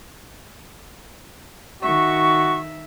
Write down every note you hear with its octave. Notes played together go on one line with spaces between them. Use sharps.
D#3 F#4 E5 C#6